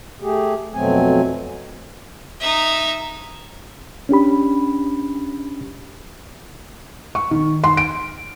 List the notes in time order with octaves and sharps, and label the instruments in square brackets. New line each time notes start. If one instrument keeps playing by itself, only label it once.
[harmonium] A3 G4 G#4
F2 B2 F#3 A3 C4 G#5
[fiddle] D#4 E5
[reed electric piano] C#4 D4 G4 B5
[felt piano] C#6
D#3
C6
D7